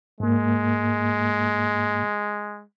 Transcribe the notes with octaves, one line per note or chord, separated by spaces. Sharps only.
G#2 G#3 A#3